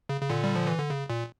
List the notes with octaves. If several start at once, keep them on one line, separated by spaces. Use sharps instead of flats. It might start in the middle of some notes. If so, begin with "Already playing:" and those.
C#3
C#3
A#2 D3
G3
F3
E3
D3
C#3
A#2